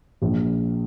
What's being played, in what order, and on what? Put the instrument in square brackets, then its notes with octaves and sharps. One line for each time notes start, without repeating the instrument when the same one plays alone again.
[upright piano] A#1